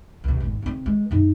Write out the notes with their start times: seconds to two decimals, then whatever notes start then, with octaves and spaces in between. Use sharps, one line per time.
0.24 C#2 C3
0.40 G#1 E2
0.62 C#3 C4
0.86 G#3
1.11 F#2 D#4